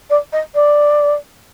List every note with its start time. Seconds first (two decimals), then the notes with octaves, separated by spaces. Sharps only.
0.10 D5
0.32 D#5
0.54 D5